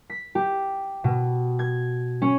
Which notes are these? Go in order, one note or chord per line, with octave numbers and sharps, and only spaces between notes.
B6
G4
B2
G#6
C#4